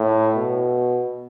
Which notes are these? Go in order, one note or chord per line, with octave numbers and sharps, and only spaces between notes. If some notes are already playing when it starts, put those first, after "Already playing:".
Already playing: A2
B2